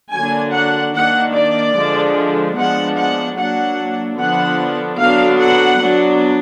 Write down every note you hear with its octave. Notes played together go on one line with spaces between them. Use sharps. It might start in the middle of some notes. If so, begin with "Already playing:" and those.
D3 F#3 A#3 D4 G#5
F#5
D#3 A#3 D4 F#5
D5
D3 F3 G#3 D4
F3 G#3 B3 D4 F#5
F#5
F#3 A#3 D4 F#5
D3 F3 B3 D4 F#5
D3 F#3 B3 D4 F5
F#5
F#3 B3 D4